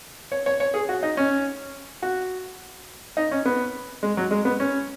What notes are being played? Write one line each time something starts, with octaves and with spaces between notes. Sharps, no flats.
C#5
C#5
C#5
G#4
F#4
D#4
C#4
F#4
D#4
C#4
B3
G#3
F#3
G#3
B3
C#4